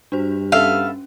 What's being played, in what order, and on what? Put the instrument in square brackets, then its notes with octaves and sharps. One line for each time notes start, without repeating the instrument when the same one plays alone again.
[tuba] G2 [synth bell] D4 F#4 C5
[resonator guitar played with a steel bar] B3 A4 E5 [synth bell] C#4 [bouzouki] F5